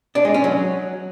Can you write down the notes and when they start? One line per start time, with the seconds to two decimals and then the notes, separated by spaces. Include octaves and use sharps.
0.15 D4
0.25 G#3
0.34 C#4
0.44 F#3